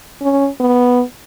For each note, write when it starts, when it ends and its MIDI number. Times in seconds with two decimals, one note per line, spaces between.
0.21 0.48 61
0.60 1.02 59